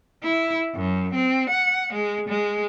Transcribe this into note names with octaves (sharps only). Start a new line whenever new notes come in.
E4
F#2
C4
F#5
G#3
G#3